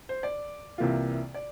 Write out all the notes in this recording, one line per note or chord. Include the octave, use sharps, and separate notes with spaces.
C5
D5
C2 C3 E3 A#3 F4
D5